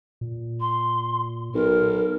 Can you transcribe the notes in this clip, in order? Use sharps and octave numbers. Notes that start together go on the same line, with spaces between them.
A#2
C6
B1 A#4